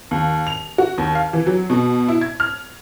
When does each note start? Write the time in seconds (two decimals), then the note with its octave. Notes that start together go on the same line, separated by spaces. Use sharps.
0.11 D#2
0.47 F7
0.78 F#4
0.98 D#2
1.15 F5
1.33 E3
1.47 F#3
1.70 B2
2.08 E4
2.21 G#6
2.40 F6